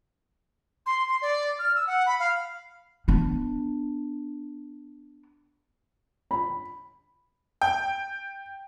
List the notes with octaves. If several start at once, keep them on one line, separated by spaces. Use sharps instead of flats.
C6
C6
D5
F6
E6
F#5
B5
F5
B3 D4
B5
G5